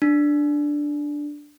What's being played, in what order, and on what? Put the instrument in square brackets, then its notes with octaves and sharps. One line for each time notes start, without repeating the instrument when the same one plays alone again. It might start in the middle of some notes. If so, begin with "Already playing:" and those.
[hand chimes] D4